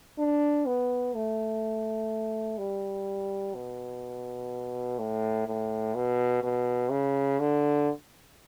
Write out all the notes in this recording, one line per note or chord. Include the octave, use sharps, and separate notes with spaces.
D4
B3
A3
G3
B2
A2
A2
B2
B2
C#3
D3